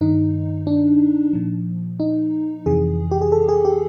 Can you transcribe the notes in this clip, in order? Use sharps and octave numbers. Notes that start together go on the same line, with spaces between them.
G2 D#3 D#4
D4
A#2 F3
D#4
F2 C3 E3 G#4
G4
G#4
A4
G#4
G4